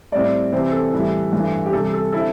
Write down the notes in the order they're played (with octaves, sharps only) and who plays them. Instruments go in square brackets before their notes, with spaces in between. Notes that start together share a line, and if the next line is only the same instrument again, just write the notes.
[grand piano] A2 G3 C4 E4 D5
C3 E3 C4 E4 C5
A4
A2 E3 G3 E4
G2 E3 A3 E4
G4
C3 E3 G3 A4
A4
D3 C4 E4 A4